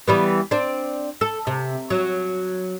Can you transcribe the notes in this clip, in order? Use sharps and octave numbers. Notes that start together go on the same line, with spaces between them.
E3 G3 B3
C4 D4
A4
C3
F#3